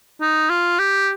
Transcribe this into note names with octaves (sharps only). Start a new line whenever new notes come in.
D#4
F4
G4